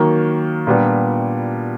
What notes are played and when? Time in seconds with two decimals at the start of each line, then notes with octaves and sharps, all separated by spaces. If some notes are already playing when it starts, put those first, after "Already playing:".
Already playing: D#3 F#3 A#3
0.67 A#2 G3 B3 D4